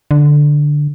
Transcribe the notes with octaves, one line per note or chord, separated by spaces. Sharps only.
D3